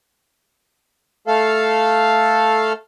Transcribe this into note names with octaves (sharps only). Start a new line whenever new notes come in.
A3 A4 F5